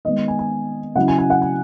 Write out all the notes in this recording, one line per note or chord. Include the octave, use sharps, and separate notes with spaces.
D#3 G#3 B3 D#5
G#5
G#5
C#3 F#3 C#4 E4 F#5
G#5
G#5
F#5
G#5